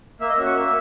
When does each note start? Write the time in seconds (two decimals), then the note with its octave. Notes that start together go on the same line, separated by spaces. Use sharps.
0.20 A#3 E5
0.29 D#5
0.37 C#4 F#4 E5
0.46 C#6
0.55 A#3 E5